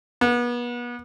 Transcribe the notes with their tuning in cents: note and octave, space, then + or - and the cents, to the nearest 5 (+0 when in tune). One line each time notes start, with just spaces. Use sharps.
B3 -35